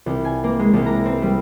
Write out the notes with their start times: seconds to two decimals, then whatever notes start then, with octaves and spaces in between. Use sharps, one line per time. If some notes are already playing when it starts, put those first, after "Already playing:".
0.06 C2
0.25 G#5
0.44 A#3
0.59 G#3
0.73 C2
0.86 A#5
1.05 C4
1.22 G3